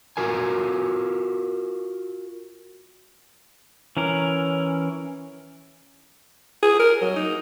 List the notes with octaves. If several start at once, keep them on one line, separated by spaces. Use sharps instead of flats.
F4 F#4 A#4 G#5
E3 C#4 A#4
G#4
A#4
F#3
D#4